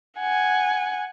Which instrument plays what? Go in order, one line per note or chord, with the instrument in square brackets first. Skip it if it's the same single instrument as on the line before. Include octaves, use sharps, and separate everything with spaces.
[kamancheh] F#5 G#5